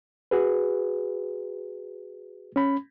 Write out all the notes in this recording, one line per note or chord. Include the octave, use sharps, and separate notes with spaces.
F#4 G#4 B4
C#4 B5